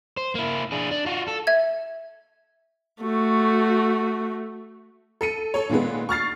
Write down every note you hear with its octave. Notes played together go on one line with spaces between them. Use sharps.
C5
A#3 E4
D4 G#4
D4
F4 F#4
A4
E5 G#6
A3 F#4
A4 C#7 D#7
A4 C#5
A#2 D#3 G#3 B3
C#6 F6 A6 C7